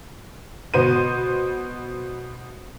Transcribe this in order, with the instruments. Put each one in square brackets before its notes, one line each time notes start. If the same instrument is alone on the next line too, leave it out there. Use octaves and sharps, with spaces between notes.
[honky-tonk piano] B2 B3 C5 D#7